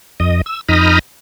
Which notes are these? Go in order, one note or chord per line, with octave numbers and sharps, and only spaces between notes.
F2 D#5
E6
F2 D#4 A#5 B5 D#6 F6